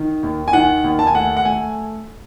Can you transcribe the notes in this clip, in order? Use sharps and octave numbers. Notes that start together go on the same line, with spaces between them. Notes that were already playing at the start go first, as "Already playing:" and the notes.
Already playing: D#3
D#2
G#5
D#3 F#5
D#2
A5
G#5
A3 F#5
F#5
A3 G#5